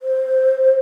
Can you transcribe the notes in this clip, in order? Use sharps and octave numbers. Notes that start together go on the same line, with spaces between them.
C5